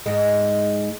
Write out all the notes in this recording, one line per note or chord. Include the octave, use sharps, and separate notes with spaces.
G#2 G#3